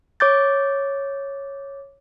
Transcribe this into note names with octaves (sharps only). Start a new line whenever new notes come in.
C#5 D6 G6 A6